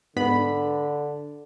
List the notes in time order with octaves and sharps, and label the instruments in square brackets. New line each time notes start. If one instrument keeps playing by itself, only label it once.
[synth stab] G#2 B3 B5 [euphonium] D3